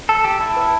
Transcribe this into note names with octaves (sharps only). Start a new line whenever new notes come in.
A4 A5
G4 A5
E4 A5
B4